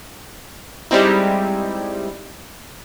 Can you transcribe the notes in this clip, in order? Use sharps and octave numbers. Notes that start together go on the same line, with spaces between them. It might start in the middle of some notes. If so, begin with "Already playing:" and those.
G3 G#3 C4 D#4 E4